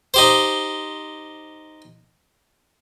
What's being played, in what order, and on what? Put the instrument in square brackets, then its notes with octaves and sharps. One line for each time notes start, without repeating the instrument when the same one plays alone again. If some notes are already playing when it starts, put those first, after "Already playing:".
[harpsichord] D#4 G4 C5